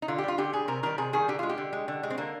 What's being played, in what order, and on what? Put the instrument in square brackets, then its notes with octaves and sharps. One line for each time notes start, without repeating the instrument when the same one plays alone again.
[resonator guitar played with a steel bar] D#4
D3 F4
G4
G3 F4
D3 G4
G3 G#4
C3 A#4
D#3 G3 A#4
C3 G#4
D#3 G3 G#4
D3 G4
G#3 F4
G4
D3
G#3
D3
G#3
C4
D3 A#3